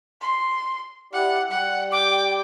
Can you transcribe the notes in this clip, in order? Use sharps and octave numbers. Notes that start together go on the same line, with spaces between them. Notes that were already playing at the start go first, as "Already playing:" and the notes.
C6
E4 G4 D5 F#5
G3 F#5
G5 D6